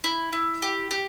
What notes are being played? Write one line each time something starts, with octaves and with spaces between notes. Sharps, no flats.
E4
E4
G4
G4